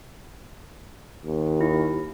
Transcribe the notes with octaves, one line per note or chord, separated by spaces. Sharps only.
D#2
E4